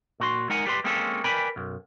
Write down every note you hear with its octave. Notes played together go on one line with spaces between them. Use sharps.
A#2 F#4 C6
G#3 D#4 A#4 F#5 G#5
G3 G4 B4 C6
G#3 A#3 C4 C#4 A4
A#4 B4 D5 G5 G#5 B5
B1 F#2